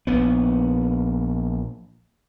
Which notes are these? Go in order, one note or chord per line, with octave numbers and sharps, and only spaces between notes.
A#1 B3